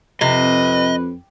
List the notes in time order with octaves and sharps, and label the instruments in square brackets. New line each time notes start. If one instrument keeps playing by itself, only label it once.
[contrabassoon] F2 [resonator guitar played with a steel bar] C3 [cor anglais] B4 [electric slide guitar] D#5